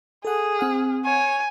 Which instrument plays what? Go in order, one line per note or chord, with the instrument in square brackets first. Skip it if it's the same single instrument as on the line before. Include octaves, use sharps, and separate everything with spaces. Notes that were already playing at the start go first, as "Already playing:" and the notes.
[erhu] G#4 [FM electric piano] A4 F#5
[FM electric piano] C4 F#5 F6
[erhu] C#5 [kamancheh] G#5